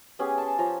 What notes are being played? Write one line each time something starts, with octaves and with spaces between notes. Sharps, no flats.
B3 C#4 G4 G#4
A5 C6
F3 C#4 A#5